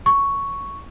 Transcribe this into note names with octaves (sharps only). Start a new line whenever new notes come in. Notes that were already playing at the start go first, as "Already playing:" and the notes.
C#6